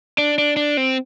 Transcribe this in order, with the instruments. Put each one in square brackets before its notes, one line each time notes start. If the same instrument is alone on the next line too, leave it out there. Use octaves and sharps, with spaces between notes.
[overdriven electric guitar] D4
D4
D4
C4